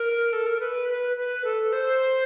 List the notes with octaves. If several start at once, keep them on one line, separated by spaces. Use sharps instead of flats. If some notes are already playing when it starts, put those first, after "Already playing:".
Already playing: A#4
A4
A#4
B4
B4
B4
A4
C5